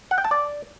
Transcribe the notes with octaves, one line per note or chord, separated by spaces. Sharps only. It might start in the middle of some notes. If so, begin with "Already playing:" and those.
F#5
G5
A5
D5